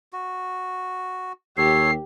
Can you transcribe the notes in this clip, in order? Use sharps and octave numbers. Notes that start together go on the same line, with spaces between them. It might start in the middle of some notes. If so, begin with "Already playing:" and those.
F#4
D#2 G4 A4 C#5 C7